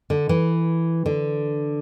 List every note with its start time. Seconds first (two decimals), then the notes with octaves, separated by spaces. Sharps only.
0.10 D3
0.29 E3
1.06 D3